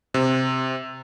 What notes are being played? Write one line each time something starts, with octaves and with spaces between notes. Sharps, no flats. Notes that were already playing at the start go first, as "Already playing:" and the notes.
C3